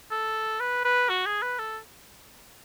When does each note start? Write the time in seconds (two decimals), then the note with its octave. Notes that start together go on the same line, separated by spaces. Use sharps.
0.11 A4
0.60 B4
0.85 B4
1.09 F#4
1.26 G#4
1.42 B4
1.59 A4